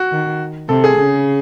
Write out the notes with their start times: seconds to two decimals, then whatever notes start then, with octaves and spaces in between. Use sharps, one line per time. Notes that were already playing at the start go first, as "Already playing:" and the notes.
Already playing: F#4
0.11 D#3
0.68 C3 A4
0.84 G#4
0.97 C#3